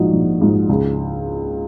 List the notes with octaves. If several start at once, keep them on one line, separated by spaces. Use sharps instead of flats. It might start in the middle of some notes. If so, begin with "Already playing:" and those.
Already playing: A#1 G#2 F3 D#4 F#4
A#1
G#2 F3
C#2